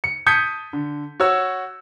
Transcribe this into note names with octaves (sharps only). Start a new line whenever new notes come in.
C#7
A5 D#6 G6 G#6 B6 C#7
D3
F#4 C#5 E6